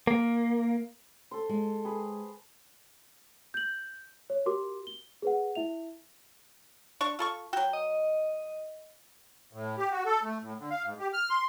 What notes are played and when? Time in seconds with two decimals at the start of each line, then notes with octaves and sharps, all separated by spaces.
0.07 A#3
1.31 A4 C5
1.49 G#3
1.85 G#4 B4
3.54 G6 F#7
4.30 C#5
4.46 F#4 G4 A#4 C6 D6
4.87 G7
5.22 G#4 B4 F#5
5.55 E4 E5 F7
7.01 D4 C#6
7.19 F4 A4 C#6
7.53 F#3 F#4 G5
7.73 D#5
9.53 A2
9.78 G4
9.92 F#4
10.06 A4
10.23 A3
10.42 A2
10.59 D3
10.70 F5
10.84 G#2
10.99 G4
11.13 F6
11.30 C6